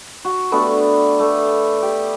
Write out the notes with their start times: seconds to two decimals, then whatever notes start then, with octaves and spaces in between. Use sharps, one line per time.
0.25 F#4
0.52 A3 B3 D4 G4
1.19 A3
1.82 G4